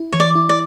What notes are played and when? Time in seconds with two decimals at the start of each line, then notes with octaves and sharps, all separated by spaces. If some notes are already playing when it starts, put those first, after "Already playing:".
Already playing: E4
0.12 E3 C#5
0.20 D5
0.35 E4
0.49 D5